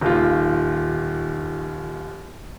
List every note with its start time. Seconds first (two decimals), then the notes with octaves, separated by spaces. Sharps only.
0.01 D#1 D#2 F4